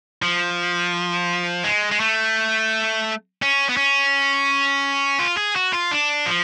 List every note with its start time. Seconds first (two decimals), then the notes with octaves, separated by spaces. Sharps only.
0.22 F3
1.64 G#3
1.92 G#3
2.00 A3
3.42 C#4
3.69 B3
3.77 C#4
5.19 F4
5.37 G#4
5.56 F#4
5.73 F4
5.91 D4
6.26 F3